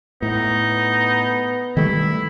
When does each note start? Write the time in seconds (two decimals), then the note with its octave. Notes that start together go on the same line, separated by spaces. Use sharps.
0.22 A2 B3 D#4
1.77 D#3 G3 A3 E4